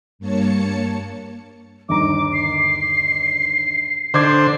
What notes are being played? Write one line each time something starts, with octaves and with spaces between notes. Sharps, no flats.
G2 A#3 C#5 A5 C#7
G1 D#2 A#5 D6
C7
D3 C5 C6 D6 G#6